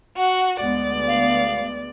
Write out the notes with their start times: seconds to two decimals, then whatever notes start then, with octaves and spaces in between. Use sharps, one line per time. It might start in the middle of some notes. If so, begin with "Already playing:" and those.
0.17 F#4 F#5
0.60 D2 G#3 B3 D5
1.07 F5